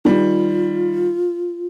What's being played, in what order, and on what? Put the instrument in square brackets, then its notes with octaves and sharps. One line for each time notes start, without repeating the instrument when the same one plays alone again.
[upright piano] D#3 G3 [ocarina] F4